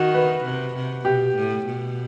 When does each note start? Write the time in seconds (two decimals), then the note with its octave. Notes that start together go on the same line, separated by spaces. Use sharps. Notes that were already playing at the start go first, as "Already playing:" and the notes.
Already playing: D#3 F#4
0.14 B4
0.44 C3
0.75 C3
1.05 B2 G4
1.35 A2
1.66 B2